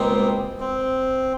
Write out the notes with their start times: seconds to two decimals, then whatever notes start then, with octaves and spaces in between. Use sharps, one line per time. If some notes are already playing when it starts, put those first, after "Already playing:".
Already playing: C#2 B2 G3 A#3 C4 D#4
0.60 C4